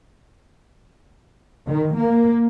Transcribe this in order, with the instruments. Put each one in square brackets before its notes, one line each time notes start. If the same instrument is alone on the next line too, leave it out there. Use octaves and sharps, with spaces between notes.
[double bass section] D#3
A#3